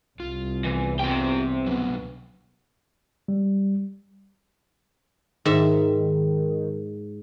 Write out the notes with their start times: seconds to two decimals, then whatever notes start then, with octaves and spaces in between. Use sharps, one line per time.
0.20 C2 F4
0.64 E2 E3
0.99 C3 F4 G4 G5
1.66 B2 D3 F#3 B3
3.28 G3
5.45 G#2 D#3 E5